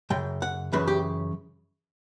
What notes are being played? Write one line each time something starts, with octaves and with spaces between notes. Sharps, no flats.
F#2 C#3 G5
F#5
F#2 C#3 E3 B4
G4